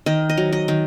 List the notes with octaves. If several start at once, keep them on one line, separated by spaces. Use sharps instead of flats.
D#3 D#5
D#5
F#3
D#5
D#3